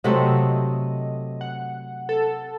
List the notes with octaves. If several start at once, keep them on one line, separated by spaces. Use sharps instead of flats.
C3 F#3 A3 C4 D#5
F#5
A4